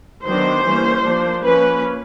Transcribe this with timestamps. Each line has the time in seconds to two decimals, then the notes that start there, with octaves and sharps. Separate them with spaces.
0.25 D#3 F#3 B3 D4 C5
0.65 E3 G3 A#3 C#4
1.04 F3 A#3 D4
1.44 F3 A#3 C#4 B4